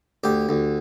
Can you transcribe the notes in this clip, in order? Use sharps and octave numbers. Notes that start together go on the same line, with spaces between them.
D2 G4
D2